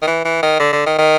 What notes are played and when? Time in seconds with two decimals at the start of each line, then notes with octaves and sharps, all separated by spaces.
0.02 D#3
0.07 E3
0.25 E3
0.42 D#3
0.59 D3
0.73 D3
0.86 D#3
0.98 D#3